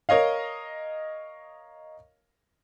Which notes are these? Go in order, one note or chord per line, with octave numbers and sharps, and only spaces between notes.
A#4 C#5 D#5 F5